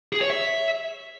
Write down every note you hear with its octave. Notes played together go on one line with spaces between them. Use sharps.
G#4
C#5
E5